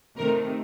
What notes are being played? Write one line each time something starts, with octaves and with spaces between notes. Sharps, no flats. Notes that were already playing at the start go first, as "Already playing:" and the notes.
C3 D#3 A3 A#4